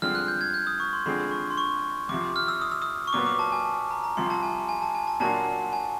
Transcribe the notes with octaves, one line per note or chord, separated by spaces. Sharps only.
G2 D3 F3 G#3 C4 F6
F#6
G6
G#6
G6
D#6
C#6
C6
D3 F3 G#3 C4 B5
C#6
C6
C#6
F2 C3 F3 D6
F6
E6
D#6
E6
D#6
C#6
A#2 F#3 B3 D6
D6
A5
G#5
A5
A#5
A#5
C2 C3 F3 C6
A5
G#5
G#5
A5
G#5
A5
A#2 F#3 A#3 D4 F#4 A5
G#5